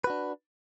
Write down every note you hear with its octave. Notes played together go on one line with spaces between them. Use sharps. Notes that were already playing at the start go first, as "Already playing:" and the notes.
D4 F#4 B4